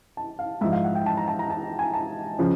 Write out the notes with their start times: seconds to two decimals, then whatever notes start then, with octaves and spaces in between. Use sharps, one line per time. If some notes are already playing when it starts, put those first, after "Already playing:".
0.17 A5
0.39 F5
0.61 G#2 E5
0.64 F3
0.72 F5
0.84 F#5
0.95 G5
1.06 A5
1.17 A#5
1.28 A5
1.39 A#5
1.50 A5
1.79 G#5
1.94 A5
2.39 C#3 F3